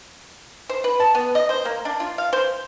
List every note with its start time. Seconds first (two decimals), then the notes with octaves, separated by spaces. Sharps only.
0.69 C5
0.84 B4
1.00 A5
1.15 B3
1.35 D#5
1.49 C5
1.65 A#3
1.85 D4
2.00 F4
2.18 F5
2.33 C5